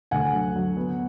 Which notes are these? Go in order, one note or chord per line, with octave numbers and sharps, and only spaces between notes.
D2 F#5 G#5
F#3
F#3
B3